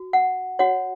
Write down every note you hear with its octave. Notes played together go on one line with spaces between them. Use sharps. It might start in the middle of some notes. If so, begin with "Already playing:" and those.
Already playing: F#4
F#5
F#4 C#5 F#5